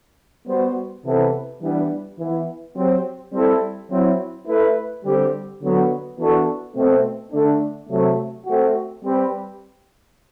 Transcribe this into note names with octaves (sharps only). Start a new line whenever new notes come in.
G3 B3 F#4 C5
C3 E3 B3 E4 A4
E3 G3 B3 D4
E3 B3 E4
F#3 C4 G4 C5
G3 C4 E4 A4
F#3 C4 E4
A3 E4 B4
D3 G3 C4 G4
D3 F#3 B3
E3 B3 D4 F#4 A4
B2 A3 C4
D3 A3 D4
C3 F#3 A3
A3 C4 F#4
G3 C4 G4 B4